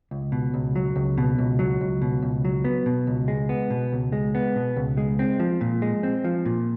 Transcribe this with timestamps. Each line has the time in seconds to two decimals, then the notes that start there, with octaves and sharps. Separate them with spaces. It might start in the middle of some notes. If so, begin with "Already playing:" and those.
0.11 C#2
0.32 B2
0.54 C#2
0.75 F#3
0.96 C#2
1.18 B2
1.38 C#2
1.59 F#3
1.81 C#2
2.02 B2
2.22 C#2
2.45 F#3
2.65 B3
2.86 B2
3.07 C#2
3.28 G#3
3.49 B3
3.70 B2
3.92 C#2
4.12 G#3
4.35 B3
4.56 B2
4.76 C#2
4.97 G#3
5.19 C4
5.40 F3
5.61 A#2
5.82 G#3
6.03 C4
6.25 F3
6.45 A#2